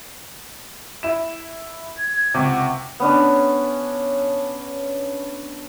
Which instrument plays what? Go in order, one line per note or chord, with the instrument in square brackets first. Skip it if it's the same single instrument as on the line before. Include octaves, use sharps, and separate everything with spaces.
[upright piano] E4 E7
[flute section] G#6
[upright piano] C#2 C3 [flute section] F#5 C#6
[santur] B3 C#4 D4